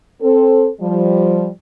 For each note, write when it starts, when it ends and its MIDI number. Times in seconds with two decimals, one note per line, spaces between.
0.21 0.69 60
0.21 0.69 69
0.81 1.48 53
0.81 1.48 55